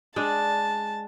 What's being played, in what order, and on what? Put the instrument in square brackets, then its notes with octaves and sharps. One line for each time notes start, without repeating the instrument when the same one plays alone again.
[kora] G#3 D4 [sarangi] A5